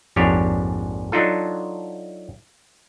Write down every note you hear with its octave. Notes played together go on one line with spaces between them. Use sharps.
A#1 F2 G#2 D4 G4 C#5
F#3 D4 D#4 F4 A4